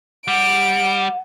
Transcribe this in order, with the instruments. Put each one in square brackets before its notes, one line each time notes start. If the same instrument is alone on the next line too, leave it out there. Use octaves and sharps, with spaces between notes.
[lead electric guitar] G3 [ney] F#5 [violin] D7